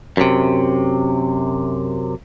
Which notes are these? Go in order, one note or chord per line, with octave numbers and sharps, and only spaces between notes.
F#2 C3